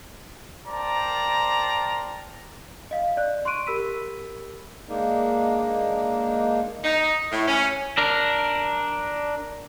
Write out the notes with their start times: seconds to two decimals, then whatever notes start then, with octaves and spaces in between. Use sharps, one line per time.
0.67 A#4 C5 D5 G5 A5 A#5
2.91 D#5 F5
3.17 D5 F#6
3.45 C6 C#6 F#6 D7 D#7
3.66 G4 A#4 B5 E6 B6 D#7
4.88 G#3 A#3 D4 D#4
6.84 D#4
7.32 A2
7.47 C#4
7.98 D4 A#4